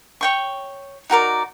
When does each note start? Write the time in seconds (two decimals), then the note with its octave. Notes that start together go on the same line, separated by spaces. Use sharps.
0.21 C#5 G5 C#6
1.10 D#4 F#4 A#4 D5